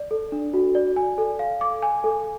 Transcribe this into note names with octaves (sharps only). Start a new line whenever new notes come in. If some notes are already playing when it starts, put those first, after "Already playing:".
Already playing: D5
A4
D4
F#4
D5
G#5
A4
F5
D6
G#5
A4